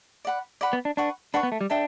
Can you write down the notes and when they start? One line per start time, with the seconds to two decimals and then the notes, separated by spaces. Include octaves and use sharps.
0.25 D5 F#5 B5
0.61 D5 F#5 B5
0.73 B3
0.85 D4
0.97 D4 B4 F#5 C#6
1.34 D4 B4 F#5 C#6
1.43 B3
1.52 A3
1.61 G3
1.70 D4 A4 E5 G5